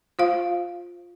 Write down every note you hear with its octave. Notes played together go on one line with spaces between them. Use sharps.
F4 C5 F5